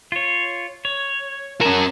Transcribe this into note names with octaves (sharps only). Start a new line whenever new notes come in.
F4 C#5
C#5
C#4 F#4 G#4 A#4 A5